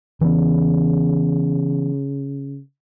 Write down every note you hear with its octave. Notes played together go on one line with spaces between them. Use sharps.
C#3 E3 B3